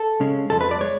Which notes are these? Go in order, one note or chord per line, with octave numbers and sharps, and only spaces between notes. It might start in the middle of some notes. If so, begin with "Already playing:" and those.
Already playing: A4
C#3 G#3 C#4
F2 F3 G#3 A4
B4
D5
G#3 C#5